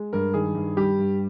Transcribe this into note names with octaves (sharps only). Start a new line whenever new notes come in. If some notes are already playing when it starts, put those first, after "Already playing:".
Already playing: G#3
G2 A#4
D#3 G#4
G2
G3 G4
G2